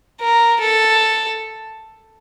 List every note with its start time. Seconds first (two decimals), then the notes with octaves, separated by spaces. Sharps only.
0.21 A#4
0.60 A4